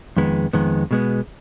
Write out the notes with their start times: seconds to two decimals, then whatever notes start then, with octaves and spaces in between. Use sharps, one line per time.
0.17 F2 D#3 G#3 B3
0.53 F2 D#3 G#3 B3
0.91 B2 G#3 B3